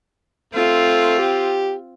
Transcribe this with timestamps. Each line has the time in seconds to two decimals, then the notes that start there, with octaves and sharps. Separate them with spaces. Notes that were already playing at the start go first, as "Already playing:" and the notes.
0.54 A3 C4 F4
1.19 G4